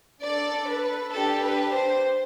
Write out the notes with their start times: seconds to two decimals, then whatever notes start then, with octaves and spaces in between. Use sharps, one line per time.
0.23 D4 A4 D5
0.69 B4
1.14 D4 G4 A4
1.44 B4
1.74 C5